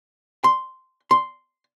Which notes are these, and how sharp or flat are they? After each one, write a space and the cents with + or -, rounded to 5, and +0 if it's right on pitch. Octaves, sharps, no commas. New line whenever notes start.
C6 -5
C6 -5